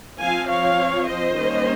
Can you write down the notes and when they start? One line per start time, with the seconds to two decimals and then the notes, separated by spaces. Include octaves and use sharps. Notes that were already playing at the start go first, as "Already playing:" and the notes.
0.20 F3 C4 F5 G#5
0.49 C#5 F5
1.08 C5 D#5
1.37 D#3 G3 A#3 C#4